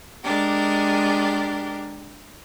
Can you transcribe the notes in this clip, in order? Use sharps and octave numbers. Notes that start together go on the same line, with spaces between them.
G#3 D4 G4 A#4